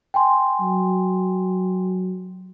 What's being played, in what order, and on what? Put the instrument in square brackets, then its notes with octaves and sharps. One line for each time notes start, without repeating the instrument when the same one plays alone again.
[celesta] G5 G#5 C6
[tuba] F#3